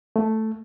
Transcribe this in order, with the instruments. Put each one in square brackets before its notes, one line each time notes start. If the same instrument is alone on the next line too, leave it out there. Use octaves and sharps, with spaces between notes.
[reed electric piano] A3